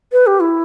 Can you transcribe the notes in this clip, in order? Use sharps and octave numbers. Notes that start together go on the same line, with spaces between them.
B4
G4
E4